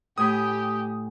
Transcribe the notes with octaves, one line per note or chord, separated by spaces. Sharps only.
A2 G4 G#5 B5 D#6